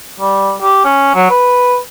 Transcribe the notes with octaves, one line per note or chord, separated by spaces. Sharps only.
G3
G4
C#4
F#3
B4